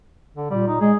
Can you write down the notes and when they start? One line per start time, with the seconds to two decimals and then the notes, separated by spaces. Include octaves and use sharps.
0.36 D3
0.50 A#2 G3
0.68 D#4
0.81 G#3 G#4